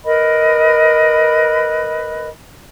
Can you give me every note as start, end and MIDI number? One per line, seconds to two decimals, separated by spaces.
0.05 2.27 70
0.05 2.27 71
0.05 2.27 75
0.05 2.27 83